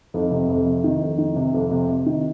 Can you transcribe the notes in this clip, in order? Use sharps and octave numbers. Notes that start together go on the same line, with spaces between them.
F2 D#4
C3
F2
C3
D#3
F2
D#3
C3
F2
C3
C3
D#3